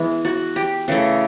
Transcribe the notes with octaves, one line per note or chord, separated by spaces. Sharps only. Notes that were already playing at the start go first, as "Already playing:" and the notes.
Already playing: E3 G#3 B3
F#4
G4
C#3 E3 A3